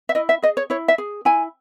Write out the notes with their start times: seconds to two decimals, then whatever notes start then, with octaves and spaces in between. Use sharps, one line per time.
0.09 E5
0.15 E4 D#5
0.29 E5
0.42 G#4 D#5
0.57 C#5
0.70 E4 C#5
0.88 E5
0.98 G#4
1.25 E4 G#5